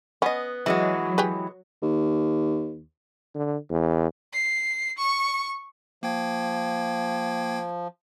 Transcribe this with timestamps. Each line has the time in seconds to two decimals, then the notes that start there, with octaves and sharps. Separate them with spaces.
0.22 B3 C#4 D#5
0.66 E3 F#3 G#3 E4 F#4
1.18 G4 G#4 B4
1.82 D#2
3.35 D3
3.70 E2
4.33 C7
4.98 C#6
6.03 F3 A#3 G5 G#6